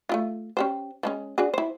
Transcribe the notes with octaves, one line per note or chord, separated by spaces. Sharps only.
A3 E4 F4
C#4 G4 C5
F3 G#3 C#4
D4 F#4 G#4
E4 C5